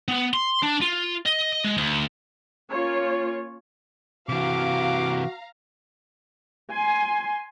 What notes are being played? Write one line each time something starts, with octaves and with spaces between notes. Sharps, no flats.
B3
C6
D4
F4
D#5
G#3
D2
A#3 C#4 F4 C#5
C3 E3 F#4 F5 A#5 D6
G#5 C6